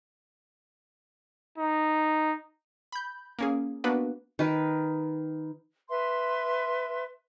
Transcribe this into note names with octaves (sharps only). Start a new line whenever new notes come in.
D#4
B5 G6
A#3 C#4 G#4
A#3 B3 D4 F#4 B4
D#3 B4
B4 E5 C6